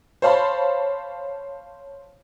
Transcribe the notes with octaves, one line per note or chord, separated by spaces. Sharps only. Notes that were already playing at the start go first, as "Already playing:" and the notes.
C5 C#5 F5 A5 B5